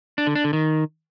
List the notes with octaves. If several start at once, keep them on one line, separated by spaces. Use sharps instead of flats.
D4
D3
D4
D3
D#3